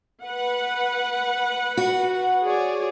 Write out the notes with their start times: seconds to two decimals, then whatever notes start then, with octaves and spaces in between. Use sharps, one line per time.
0.24 B4 F#5
1.77 F#4
2.43 G#4 C#5 D5